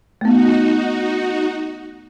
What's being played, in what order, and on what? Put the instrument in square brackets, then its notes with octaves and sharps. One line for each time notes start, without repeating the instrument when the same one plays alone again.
[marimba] A3 B3 [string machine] D#4 F#4